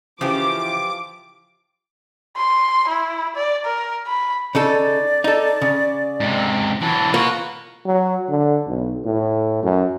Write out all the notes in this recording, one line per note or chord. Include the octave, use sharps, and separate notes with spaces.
C#3 E3 F3 G4 D6
C6
E4
D5
A#4
B5
C#3 D#4 A4 D5
D#4 A4
C#3
G#2 C3
E3 F#3 A5
A#3 F4 F#4 B4 C#6
F#3
D3
B1
A2
F#2